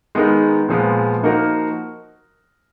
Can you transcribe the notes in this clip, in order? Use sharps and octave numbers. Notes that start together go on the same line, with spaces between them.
D#3 G#3 B3 D#4 A#4
A#2 F3 G#3 B3
F3 A#3 D#4 F#4 A#4